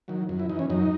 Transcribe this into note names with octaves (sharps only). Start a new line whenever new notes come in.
D#3 F#3
F#2
E4
E3 D#4
C#4
F#2 D#4